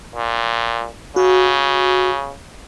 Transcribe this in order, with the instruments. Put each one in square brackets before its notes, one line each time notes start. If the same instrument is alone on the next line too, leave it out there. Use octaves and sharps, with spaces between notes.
[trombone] A#2
[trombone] C#3 [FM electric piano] F#4